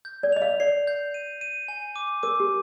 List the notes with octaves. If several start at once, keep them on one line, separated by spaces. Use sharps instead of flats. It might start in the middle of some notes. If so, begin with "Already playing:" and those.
G6
D5
D#5 F7
F5
D5 C7
G6
D#7
D#7
G#5
D6
A#4 D6
G4